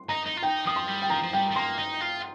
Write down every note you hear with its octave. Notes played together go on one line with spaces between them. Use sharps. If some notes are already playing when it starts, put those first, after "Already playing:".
Already playing: C6
D#4 A#5
D#4
F4
D#4 G5
F3 D#6
C6
G3
G5
F3 A#5
F3
G3 G5
G3
A#3 C6
D#4
F4